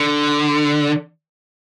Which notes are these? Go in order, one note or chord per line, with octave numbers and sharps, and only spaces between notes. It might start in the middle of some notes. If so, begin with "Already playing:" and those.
Already playing: D3